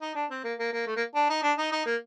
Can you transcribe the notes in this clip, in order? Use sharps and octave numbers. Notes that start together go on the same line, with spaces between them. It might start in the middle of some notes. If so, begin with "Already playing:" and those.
D#4
D4
C4
A#3
A#3
A#3
A3
A#3
D4
D#4
D4
D#4
D#4
A#3